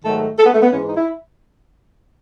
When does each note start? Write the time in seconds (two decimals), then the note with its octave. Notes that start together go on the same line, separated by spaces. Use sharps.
0.04 G#2 D#3 F#3 A3 A4
0.37 A4
0.45 B3
0.53 A3
0.62 B3
0.70 G#2 E3 G#3 C#4
0.87 D#4
0.96 E4